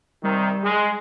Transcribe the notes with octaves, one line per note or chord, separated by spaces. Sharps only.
C3 D#3 G3
G#3